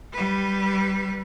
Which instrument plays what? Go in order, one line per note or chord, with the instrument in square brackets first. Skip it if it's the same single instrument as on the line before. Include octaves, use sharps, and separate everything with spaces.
[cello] G3 B4